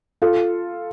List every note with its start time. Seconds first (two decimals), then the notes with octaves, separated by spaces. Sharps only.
0.22 F4 A4